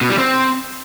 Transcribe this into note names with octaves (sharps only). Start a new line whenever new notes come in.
B2
G3
C4